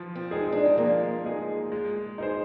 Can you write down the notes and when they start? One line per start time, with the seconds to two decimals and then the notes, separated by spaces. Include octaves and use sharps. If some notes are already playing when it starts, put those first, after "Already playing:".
Already playing: F3
0.15 C4
0.31 G#3 D#4 G#4
0.52 D4
0.65 C4
0.78 F3 A#3
1.24 G#3 D#4 G#4
1.72 G#3
2.18 D#4 G#4 C5